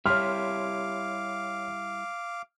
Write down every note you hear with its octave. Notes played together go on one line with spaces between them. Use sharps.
G3 E4 G4 C#5 F5 C6 D6 F6